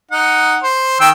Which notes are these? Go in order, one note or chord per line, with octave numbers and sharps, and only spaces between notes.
D#4 F#5
C5
D#3 G5 E6